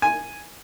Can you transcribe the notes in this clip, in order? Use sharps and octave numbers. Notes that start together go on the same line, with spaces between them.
G#5